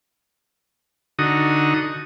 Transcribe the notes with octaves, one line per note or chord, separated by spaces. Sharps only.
D3 D#4 F#4 D#6